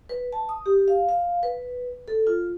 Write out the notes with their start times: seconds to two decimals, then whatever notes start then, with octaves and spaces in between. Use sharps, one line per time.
0.09 B4
0.33 A5
0.49 D#6
0.66 G4
0.88 F5
1.09 F5
1.43 B4
2.08 A4
2.27 F4